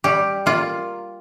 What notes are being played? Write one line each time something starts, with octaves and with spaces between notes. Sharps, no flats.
G3 G4
A#3 F4